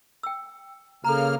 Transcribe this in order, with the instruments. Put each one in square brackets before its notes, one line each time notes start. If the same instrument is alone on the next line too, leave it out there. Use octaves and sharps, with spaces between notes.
[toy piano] G5 E6
[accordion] C#3 A#3 F6 [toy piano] A4 A#5